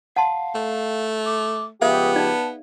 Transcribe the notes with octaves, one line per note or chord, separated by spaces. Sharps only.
F5 F#5 A5 C6
A3
D6
C#2 F3 B3 G4 G#4 E5 F5 D#6
D#4 D5 A5